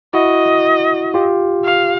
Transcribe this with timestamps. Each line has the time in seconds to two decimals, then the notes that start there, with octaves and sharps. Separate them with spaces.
0.13 E4 F#4 D#5
1.14 F4 G4
1.65 F5